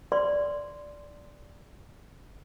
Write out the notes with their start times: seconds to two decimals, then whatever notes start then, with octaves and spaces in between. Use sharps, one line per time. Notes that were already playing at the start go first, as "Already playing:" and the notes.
0.12 D5 C6